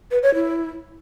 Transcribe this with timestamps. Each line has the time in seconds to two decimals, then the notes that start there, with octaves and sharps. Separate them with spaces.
0.11 B4
0.23 C#5
0.35 E4